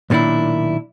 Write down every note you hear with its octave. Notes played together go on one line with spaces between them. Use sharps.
B1 A#2 D#3 D4 E4